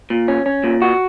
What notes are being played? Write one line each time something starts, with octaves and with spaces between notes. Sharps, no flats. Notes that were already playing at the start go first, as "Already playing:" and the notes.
A#2
C#4
C#4
A#2
F#4